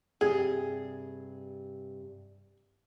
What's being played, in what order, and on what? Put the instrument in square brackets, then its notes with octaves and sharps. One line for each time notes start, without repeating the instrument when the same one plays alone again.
[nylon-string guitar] G2 C3 G4 [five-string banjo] G#4